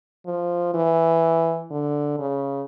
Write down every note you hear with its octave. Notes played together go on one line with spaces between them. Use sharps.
F3
E3
D3
C#3